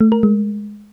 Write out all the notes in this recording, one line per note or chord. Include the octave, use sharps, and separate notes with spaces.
A3
A#4
G#3